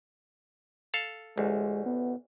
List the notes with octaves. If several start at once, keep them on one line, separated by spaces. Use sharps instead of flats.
A4 F5
A1 D2 G#3
B3